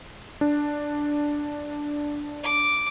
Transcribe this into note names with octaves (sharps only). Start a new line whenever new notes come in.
D4
D6